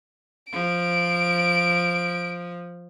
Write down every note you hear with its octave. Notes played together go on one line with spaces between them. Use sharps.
F3 D7